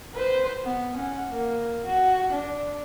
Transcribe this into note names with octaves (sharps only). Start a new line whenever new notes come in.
B4 C5
B3
C#4 F#5
A#3
F#4
D4